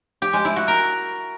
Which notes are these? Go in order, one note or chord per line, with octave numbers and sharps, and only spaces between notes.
G4
G#3
E4
F#4
A#4